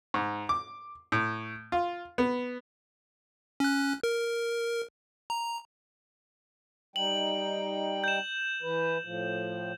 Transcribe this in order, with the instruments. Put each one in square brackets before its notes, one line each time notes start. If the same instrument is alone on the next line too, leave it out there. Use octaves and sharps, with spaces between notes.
[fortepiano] G#2
D6
A2
F4
B3
[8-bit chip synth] C#4 F#6
A#4
A#5
[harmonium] G3 D#4 G5 [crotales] F#7
[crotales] G6 E7
[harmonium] E3 B4
A2 F3